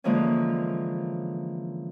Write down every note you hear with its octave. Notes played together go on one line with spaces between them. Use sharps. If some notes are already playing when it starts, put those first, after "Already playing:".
D3 E3 F3 G#3 A#3 C#4